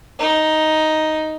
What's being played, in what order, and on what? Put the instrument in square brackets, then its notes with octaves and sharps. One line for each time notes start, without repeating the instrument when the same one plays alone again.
[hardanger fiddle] D#4